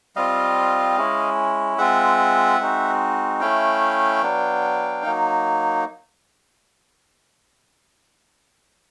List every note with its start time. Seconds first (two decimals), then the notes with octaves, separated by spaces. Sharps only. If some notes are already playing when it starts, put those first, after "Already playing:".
0.16 G3 C4 F4 D#5 F5
0.97 G#3 C#4 E4
1.78 G#3 C4 F4 E5 F#5
2.60 G#3 C4 D#4 F#4
3.41 A3 C#4 E4 F5 G5
4.23 F#3 B3 D4
5.03 F#3 A#3 D#4